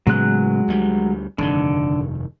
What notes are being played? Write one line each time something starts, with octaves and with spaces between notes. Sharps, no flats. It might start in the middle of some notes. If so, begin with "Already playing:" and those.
A2 C#3 F#3 G#3 B3 F#6
D2 G3
F1 G2 D3 D#3